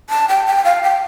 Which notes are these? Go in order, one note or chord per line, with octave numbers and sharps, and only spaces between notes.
A5
G5
G5
F5
G5